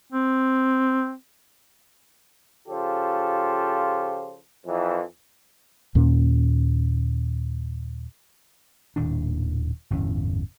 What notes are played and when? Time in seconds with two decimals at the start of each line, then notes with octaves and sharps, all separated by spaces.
0.12 C4
2.68 C#3 F3 F4 G4 A4 C5
4.67 F2 E3
5.95 D#2 A#2 C#4
8.96 D#1 D#2 A2 D4
9.91 G1 E2 A2 C#4